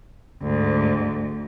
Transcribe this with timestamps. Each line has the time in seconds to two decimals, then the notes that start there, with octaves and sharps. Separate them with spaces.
0.42 D2 G#2